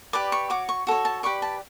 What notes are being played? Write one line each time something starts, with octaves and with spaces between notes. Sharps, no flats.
G4 B4 D5 D6
C#6
F#4 C#5 D6
C#6
F#4 A4 C#5
A5
G4 B4 D5 C#6
A5